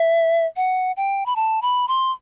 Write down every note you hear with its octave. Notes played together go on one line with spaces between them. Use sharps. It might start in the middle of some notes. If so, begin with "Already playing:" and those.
Already playing: E5
F#5
G5
B5
A5
B5
C6